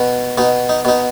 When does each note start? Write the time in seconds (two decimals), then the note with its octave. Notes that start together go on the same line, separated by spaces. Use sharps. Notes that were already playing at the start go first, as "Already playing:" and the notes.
Already playing: B2
0.38 B2 D#4
0.69 D#4
0.85 B2 D#4